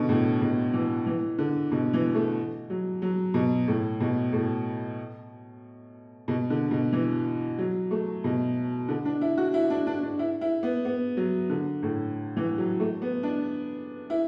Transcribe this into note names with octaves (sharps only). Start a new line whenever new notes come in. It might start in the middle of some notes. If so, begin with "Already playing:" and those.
Already playing: B2 D3
A2
B2
E3
E3
D3
B2
E3
A3
F#3
F#3
B2
A2
B2
A2
B2
D3
B2
E3
F#3
A3
B2
D3
D4
E4
F#4
E4
D4
D4
D4
E4
E4
B3
B3
F#3
D3
A2
E3
F#3
A3
B3
D4
E4